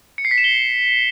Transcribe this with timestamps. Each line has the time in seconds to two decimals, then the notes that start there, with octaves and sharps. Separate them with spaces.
0.18 C#7
0.25 C7
0.31 B6
0.38 E7
0.44 G7